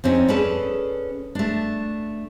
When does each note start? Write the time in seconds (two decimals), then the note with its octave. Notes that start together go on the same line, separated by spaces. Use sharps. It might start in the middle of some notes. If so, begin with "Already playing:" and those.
0.04 F2 C4 C#4 D#4
0.28 C#4 G#4 A4 B4 D5
1.35 A3 D4